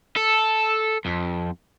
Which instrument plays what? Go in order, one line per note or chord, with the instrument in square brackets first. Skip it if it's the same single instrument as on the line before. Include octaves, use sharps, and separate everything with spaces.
[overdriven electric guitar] A4
F2